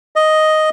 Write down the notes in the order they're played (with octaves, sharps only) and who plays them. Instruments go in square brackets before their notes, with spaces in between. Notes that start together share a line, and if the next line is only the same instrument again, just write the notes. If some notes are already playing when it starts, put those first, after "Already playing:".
[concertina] D#5